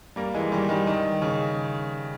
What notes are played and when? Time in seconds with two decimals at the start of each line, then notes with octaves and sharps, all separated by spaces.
0.16 G3 A#3
0.34 E3 G#3
0.52 D#3 G3
0.69 D#3 G3
0.87 D#3
1.22 C#3